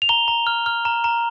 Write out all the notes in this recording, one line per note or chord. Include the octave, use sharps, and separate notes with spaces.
F7
A#5 G7
A#5
F6
F6
A#5
A#5